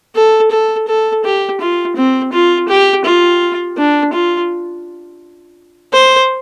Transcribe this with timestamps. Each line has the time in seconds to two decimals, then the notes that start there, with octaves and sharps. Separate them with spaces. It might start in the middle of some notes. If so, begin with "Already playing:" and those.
0.16 A4
0.51 A4
0.88 A4
1.24 G4
1.60 F4
1.97 C4
2.33 F4
2.69 G4
3.05 F4
3.78 D4
4.13 F4
5.93 C5